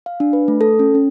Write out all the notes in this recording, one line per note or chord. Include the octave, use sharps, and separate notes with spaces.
F5
D4
B4
A3
A4
C#4
C#4